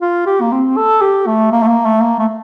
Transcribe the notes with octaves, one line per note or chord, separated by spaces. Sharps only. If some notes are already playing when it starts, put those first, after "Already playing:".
F4
G4
A#3
C4
A4
G4
A3
A#3
A3
A#3
A3
A#3
A3